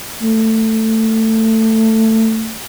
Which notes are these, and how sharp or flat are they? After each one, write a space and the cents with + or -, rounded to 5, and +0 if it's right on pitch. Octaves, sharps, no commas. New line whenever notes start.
A3 +15